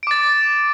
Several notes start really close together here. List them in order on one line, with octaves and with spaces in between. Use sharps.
D7 D6 A6